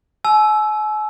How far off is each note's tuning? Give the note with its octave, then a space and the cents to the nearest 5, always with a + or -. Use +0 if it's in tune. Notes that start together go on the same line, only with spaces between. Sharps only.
G#5 +45 E6 +0